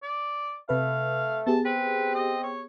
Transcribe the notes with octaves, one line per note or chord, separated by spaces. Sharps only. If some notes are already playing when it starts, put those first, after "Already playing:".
D5
C3 A3 B4 F5
B3 G4 G#4 A5
C4 B4
D#5
C#5